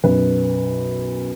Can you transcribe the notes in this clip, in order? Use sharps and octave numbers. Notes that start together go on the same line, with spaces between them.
B1 F#2 B4